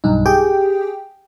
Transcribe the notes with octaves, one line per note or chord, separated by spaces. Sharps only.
B1 G2 D#4
G4 G#4 G5